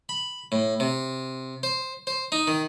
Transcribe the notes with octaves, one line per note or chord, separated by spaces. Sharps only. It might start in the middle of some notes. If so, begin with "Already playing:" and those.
B5
A2
C3
C5
C5
D#4
D#3